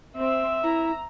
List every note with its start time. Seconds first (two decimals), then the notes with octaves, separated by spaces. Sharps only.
0.17 C4 E5
0.63 E4 A#5